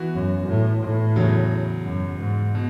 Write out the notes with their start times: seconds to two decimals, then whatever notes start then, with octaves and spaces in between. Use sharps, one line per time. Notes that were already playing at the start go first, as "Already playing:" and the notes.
Already playing: E3 B3 F#4
0.14 F#2
0.47 A2
0.82 A2
1.16 E2 C#3 F#3
1.84 F#2
2.18 G#2
2.55 B2